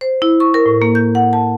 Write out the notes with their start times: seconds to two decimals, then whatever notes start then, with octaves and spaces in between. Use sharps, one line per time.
0.01 C5
0.22 E4
0.40 C#6
0.54 A#4
0.66 A2
0.82 A#3
0.95 G6
1.15 F#5
1.33 A5